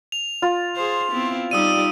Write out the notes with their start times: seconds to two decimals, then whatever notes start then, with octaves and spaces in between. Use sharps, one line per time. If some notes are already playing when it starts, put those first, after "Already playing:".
0.12 F7
0.42 F4
0.76 G#4 C5 C6
1.12 B3 C4 E4
1.51 G3 D#4 G4 D5 D#6 E6 D#7